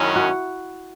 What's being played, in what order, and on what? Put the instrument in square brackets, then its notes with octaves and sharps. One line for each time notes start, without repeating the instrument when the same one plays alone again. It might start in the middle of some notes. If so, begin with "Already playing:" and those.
Already playing: [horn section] F#2 D#3 G#3 C#4 [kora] E4
[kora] F#4